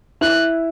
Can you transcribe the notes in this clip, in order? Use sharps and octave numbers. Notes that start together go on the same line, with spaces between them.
E4 F#6